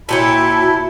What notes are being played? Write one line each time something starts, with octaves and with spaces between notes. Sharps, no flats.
A#2 E4 F#4 G4 C#5 A5